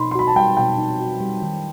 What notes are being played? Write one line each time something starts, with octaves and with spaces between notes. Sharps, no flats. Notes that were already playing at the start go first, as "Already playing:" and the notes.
Already playing: B2 D#4 B5 C6
C6
F#4 B5
A5
G3 G5
B2 G5
D#4
F#4
G3
D#3